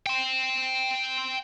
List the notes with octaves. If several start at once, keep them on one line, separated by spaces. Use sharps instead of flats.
G5 C6